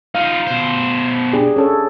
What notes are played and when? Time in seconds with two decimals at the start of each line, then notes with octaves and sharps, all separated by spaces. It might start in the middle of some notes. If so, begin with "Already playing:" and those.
0.15 D#4 F4 F5
0.47 B2 C5
1.33 D4 G4 G#4
1.56 C#4 A4 C#5